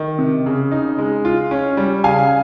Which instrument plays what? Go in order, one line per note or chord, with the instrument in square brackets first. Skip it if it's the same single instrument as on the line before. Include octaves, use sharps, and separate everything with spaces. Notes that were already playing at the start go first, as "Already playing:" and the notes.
Already playing: [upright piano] D#3
C3
C#3
D#4
G#3
F4
C#4
G3
C#3 F5 G#5